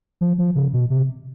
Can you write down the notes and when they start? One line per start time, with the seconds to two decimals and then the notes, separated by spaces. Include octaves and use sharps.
0.21 F3
0.38 F3
0.55 C#3
0.73 B2
0.90 C3